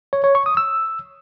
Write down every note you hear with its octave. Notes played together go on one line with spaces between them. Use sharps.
C#5
C#5
C#6
D#6
E6